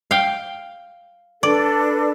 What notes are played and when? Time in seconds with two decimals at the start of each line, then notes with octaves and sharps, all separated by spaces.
0.11 F5 G5
1.43 D4 A4 B4 D5